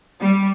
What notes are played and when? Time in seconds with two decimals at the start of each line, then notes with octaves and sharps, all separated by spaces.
0.21 G3